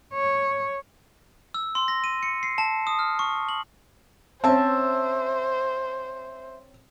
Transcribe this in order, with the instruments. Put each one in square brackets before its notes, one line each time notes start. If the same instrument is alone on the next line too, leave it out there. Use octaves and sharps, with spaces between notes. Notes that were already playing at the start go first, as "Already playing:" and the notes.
[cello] C#5
[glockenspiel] E6
C6
A#6
D#7
C#7
C7
A5
D#6
F6
C#6
F#7
[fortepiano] C4 C#4 [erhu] C5 [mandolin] E5 A5